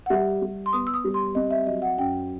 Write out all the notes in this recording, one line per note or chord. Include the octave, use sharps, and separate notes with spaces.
F#5
G3 E5
G3
C6
B3 D#6
E6
D#6
G3
C6
C4 D#5
E5
F#3 D#5
F#5
F#2 G5